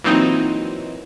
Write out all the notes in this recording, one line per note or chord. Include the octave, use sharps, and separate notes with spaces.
A#2 E3 F#3 C4 D#4